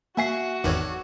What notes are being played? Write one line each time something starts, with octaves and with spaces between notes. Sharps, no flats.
A#3 F#4 E5 F#5 G#5 C#6 C7
G#1 E2 D#3 A4 C#5 D5